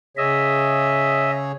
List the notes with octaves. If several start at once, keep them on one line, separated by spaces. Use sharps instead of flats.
C#3 G#4 C#5 D#5 E5